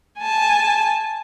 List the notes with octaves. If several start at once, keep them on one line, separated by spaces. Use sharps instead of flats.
G#5 A5